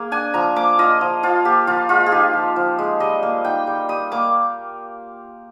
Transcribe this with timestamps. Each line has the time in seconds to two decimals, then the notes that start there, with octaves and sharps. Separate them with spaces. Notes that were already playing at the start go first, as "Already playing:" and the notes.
Already playing: A#3 G#4
0.11 D4 G#5
0.34 F3 A#5
0.56 A#3 D6
0.79 F4 D#5
1.01 F3
1.23 F3 F4
1.45 A#3 G4
1.67 F3 F4
1.89 G#3 F4
2.06 G#4
2.12 D#4 G4
2.33 F3
2.56 F3
2.79 G#3
3.00 G3 D#5
3.23 A#3
3.45 D#4 G5
3.67 G3
3.89 G3 D#6
4.12 A#3 D6